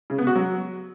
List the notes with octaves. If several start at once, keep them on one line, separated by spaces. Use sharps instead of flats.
C#3
B3
F#4
F#3